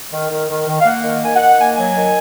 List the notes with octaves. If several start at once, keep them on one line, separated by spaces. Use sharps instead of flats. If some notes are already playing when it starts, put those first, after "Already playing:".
D#3
D#3
D#3
D#3
F5
A#3 F#5
D#3
D#3 G#5
F#5
D#3
A#3 G#5
F#3 G#5
D#3